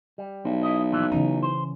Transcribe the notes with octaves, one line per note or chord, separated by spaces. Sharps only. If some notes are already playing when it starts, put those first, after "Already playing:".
G3
B1
E4 D#5
F2 A#2 E3
C#3 E3 C#4 D#4
C5